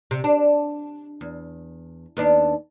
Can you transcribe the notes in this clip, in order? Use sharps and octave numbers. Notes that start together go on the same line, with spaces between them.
C3
D4
E2
D#2 B3 D4